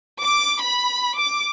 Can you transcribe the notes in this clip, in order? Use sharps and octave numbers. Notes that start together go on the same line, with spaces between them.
D6
B5
D6